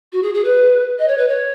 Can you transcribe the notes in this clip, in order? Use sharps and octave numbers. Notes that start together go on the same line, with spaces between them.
F#4
G#4
G#4
B4
D#5
C#5
B4
C#5